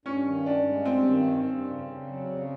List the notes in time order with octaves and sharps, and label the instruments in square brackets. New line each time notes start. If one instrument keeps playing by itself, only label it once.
[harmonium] G2 [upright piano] C#4
[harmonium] D#3
[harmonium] G2 [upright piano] D4
[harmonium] G#3
[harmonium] G2 [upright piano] C4
[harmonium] D#3
G2
G2
C#3
C#3
F#3
C#3